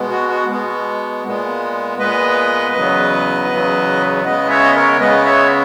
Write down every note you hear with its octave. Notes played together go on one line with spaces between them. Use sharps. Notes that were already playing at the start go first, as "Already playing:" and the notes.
Already playing: B2 G#3 B3
F#4
F#4
B2 G#3 B3
A#2 G#3 B3
A#2 G#3 B3 B4 D#5
E2 C#3 F#3 B3
E2 C#3 F#3 B3
C#3 G#3 B3 B4 D#5
C#5 E5
D#5
A#4 C#5
C#3 G#3 B3 B4 D#5
C#5 E5